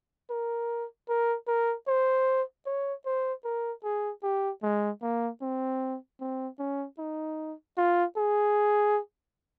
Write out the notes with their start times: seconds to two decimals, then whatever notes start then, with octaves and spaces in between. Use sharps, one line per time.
0.30 A#4
1.09 A#4
1.47 A#4
1.88 C5
2.66 C#5
3.05 C5
3.45 A#4
3.84 G#4
4.23 G4
4.63 G#3
5.02 A#3
5.42 C4
6.20 C4
6.59 C#4
6.99 D#4
7.77 F4
8.17 G#4